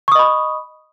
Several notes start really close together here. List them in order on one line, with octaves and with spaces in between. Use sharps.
C#6 D#6 D#5 B5